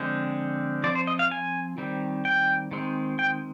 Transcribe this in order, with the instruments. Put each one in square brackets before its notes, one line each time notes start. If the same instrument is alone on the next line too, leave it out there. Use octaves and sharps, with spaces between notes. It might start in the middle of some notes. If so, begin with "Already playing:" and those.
Already playing: [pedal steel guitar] D3 F3 G#3 C4
F3 C4 D5
C5
D#5
F5
G#5
D#3 G3 C4
G5
D#3 G#3 C4
G5